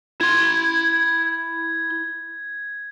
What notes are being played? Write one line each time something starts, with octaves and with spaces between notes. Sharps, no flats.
E4 C6 G#6